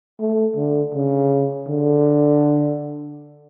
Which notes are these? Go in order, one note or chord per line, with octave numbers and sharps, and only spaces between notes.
A3
D3
C#3
D3